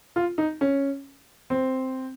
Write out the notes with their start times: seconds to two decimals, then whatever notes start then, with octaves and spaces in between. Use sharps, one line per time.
0.16 F4
0.38 D#4
0.61 C#4
1.50 C4